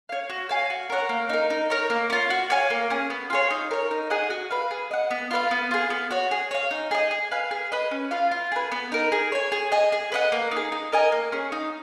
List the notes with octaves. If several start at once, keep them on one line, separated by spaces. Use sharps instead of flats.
C#5 F5
F#4
C#5 F5 G#5
F#4
A#4 C#5 F#5
A#3
D#4 A#4
D#4
A#4 C#5
A#3
C#4 F4
F#4
C#5 F5 G#5
A#3
C#4 G#4
B3
F4 G#4 C#5
D#4
A#4 C#5
D#4
G#4 D#5 F#5
F#4
B4 F5
G#4
D#5 F#5
B3
F4 B4 F5
B3
F4 G#4
B3
F#4 C#5
G#4
C#5 F5
D#4
G#4 D#5
G#4
B4 F5 G#5
G#4
B4 D#5
C#4
F4 B4 F5
F4
G#4 B4
B3
D#4 A#4
G#4
C#5 G#5
G#4
D#5 G#5
G#4
B4 D#5 F#5
A#3
D#4 G#4
D#4
A#4 D#5 G#5
A#3
C#4 G#4
D#4